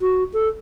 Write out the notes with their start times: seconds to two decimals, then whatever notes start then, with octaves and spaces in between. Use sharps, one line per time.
0.01 F#4
0.33 A4